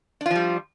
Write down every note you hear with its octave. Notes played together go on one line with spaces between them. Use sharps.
F3 G3 D4 F4